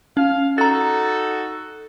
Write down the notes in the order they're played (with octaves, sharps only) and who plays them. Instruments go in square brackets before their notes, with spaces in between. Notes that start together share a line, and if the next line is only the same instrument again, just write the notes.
[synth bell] C#4 [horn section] F5
[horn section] D#4 F#4 A4 [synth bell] A#5 A6